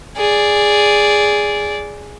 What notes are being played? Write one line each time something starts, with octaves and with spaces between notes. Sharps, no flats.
G#4 D5